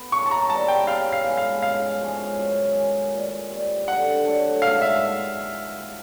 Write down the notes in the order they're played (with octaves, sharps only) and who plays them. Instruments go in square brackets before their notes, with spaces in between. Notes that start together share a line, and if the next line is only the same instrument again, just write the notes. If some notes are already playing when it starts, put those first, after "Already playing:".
Already playing: [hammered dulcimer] B3
[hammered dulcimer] C#3 [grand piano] C#6
[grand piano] A5
A#5
[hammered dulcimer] E3 G3 B3 [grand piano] A5
[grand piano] G5
[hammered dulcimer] C#3 [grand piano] F5
[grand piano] F5
[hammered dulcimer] E3 G#3 B3
[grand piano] F5
[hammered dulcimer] C#3 [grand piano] F5
[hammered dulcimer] F3 G#3 C#4
F#2
D#3 G#3
A#2
G3 C4
[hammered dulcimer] D3 [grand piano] F#5
[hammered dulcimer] F#3 A3 D4
[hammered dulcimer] G#2 [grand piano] F5
[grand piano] E5